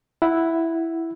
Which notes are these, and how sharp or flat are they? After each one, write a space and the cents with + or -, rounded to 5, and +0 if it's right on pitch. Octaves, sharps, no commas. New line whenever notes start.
E4 +0 F#5 +0